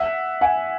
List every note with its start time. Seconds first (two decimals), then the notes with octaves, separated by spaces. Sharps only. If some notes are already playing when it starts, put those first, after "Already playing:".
Already playing: E5 F#5
0.41 F#5 G#5